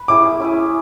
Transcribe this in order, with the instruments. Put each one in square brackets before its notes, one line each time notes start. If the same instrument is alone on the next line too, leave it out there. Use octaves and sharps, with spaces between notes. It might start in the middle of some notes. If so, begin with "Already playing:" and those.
Already playing: [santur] B4
[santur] C#4 E4 G#4 [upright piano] D6
[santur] C#4 E4 G#4